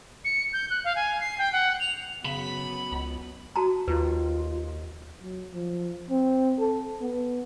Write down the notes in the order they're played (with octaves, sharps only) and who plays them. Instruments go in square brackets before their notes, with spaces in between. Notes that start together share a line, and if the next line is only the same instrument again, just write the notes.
[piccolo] C#7
G6
F#6
F5
G#5
C7
G5
F#5
F7
[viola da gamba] F#2 B3 [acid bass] C#3 [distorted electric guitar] B5
[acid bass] C#2
[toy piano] F#4 A5 A#5
[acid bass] D#2 [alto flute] F4 [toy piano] B4
[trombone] F#3
F3
C4
A4
B3